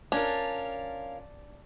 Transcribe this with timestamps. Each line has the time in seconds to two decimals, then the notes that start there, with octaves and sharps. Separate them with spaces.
0.12 C#4 D4 F4 A#4